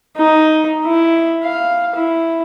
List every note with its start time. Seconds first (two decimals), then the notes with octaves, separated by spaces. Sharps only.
0.17 D#4
0.85 E4
1.43 F5
1.96 E4